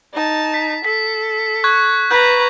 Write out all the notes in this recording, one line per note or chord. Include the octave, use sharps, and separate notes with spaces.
D#4 A5
B6
A4 B6
C#6 F#6 G#6
B4 A#5 G6 B6